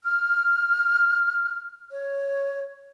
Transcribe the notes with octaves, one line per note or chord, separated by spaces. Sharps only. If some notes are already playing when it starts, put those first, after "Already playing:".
F6
C#5